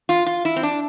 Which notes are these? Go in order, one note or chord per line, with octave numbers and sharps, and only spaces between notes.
F4
F4
E4
C4
D4